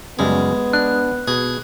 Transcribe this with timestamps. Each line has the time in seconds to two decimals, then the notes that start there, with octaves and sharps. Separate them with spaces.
0.19 F#2 C#3 G3 G#3 B3
0.73 D4 F#6
1.28 B2 G#4